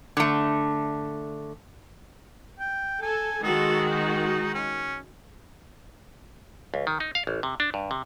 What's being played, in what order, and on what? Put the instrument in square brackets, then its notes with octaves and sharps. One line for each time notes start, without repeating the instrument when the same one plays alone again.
[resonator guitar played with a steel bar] D3 A3
[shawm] G5
[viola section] A4 [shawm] G#5
[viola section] D#3 G#3 F#4 [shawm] A4
[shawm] D#4
C#4
[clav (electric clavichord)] C#2
D#3
D#4
F5
A1
C3
D4
G2
C3